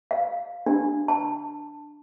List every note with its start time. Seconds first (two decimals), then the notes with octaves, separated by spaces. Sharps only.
0.11 F5
0.66 D4
1.08 A5